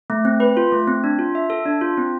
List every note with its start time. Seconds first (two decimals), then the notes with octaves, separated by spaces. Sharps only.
0.10 A3
0.25 C4
0.40 B4
0.57 F4
0.72 A3
0.88 C4
1.04 D4
1.19 F4
1.35 E5
1.50 A4
1.66 D4
1.81 F4
1.97 C4